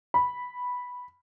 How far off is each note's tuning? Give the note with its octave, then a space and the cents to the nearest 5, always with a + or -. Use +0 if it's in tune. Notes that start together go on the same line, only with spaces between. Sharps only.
B5 -5